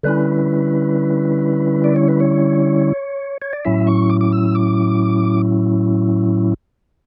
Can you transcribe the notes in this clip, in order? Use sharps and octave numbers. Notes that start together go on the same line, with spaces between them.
D3 G3 C#4 E4 B4
D5
C#5
B4
C#5
C#5
D5
A2 F#3 C#4 E4 E5
C#6
D6
D6
E6
D6